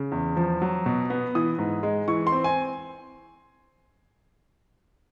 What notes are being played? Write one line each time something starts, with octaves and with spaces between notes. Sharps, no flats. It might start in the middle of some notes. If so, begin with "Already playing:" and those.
Already playing: C#3
E2
F3
F#3
B2
B3
E3 D#6
G#2
G#3
E3 C#6
C6
C4
G#5